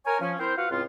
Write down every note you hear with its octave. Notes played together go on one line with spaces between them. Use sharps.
A#4 C#5 G#5
F3 C#4
C4 E4 A#4 C5
F4 F#4 B4 F5 F#5
C#2 A2 C4 F4